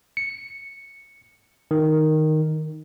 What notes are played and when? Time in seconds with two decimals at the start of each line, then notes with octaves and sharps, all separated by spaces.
0.17 C#7
1.71 D#3